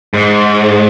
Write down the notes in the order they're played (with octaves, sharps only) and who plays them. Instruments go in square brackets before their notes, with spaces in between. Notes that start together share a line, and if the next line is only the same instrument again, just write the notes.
[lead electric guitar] G#2